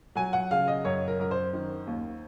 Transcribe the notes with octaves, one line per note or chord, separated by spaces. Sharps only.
F#3 G#5
F#5
C#3 F5
D#5
F#2 C#5
A#4
F#2 A#4
C5
D#3
D#2